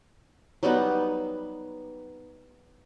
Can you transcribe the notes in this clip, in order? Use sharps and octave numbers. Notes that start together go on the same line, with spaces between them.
F#3 G3 B3 D#4